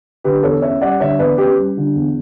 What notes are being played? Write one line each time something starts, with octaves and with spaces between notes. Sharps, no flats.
D3 G4 B4
E2 A4 C#5
C#4 C#5 E5
G3 D5 F#5
D3 C#5 E5
E2 B4 D5
C#4 G4 B4
G3
D3
E2